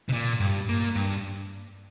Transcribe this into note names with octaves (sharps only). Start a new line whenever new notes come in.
C3
A#2
G2
A#2
G2